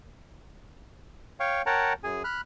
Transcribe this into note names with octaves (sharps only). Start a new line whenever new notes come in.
C#5 F5 G5 C#6
A#4 C#5 F#5 G5 A5 A#5
F#2 G#4 G#5
B5 F6 F#6